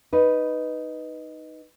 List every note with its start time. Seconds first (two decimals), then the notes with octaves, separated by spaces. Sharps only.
0.13 D#4 B4